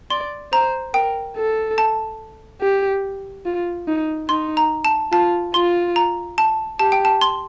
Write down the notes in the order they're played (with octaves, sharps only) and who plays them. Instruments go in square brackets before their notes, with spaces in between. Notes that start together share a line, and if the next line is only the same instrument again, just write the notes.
[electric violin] D5 [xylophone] C6
[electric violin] C5 [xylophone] A#5
[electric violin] A#4 [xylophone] G5
[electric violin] A4
[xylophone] A5
[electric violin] G4
F4
D#4
[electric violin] D#4 [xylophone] C6
[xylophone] A#5
A5
[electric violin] F4 [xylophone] A5
[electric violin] F4 [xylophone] C6
[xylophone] A#5
A5
[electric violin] G4 [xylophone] A5
[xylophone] G5
A5
C6